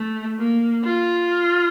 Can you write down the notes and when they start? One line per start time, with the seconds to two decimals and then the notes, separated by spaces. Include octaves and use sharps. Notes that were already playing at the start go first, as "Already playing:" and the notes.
Already playing: A3
0.39 A#3
0.84 F4